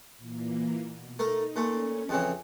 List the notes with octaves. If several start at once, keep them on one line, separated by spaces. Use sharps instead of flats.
A#2 E3 A#3
B2
A3 D#4 A#4
A#2 A3 C#4
F2 C#3 E3